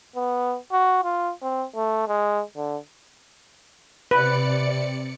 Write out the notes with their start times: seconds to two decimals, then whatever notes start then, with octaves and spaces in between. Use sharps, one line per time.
0.16 B3
0.72 F#4
1.04 F4
1.43 C4
1.76 A3
2.08 G#3
2.57 D3
4.11 C3 B4 D5 C#7